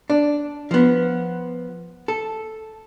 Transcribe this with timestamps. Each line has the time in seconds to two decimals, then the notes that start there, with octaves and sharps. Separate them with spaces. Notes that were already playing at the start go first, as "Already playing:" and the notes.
0.10 D4
0.71 F3 B3
2.08 A4